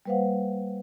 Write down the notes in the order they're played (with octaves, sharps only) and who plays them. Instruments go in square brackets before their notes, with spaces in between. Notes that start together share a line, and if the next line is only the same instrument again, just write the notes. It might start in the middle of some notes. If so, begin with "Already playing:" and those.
[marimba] G3 A#3 B4 C5 F5 F#5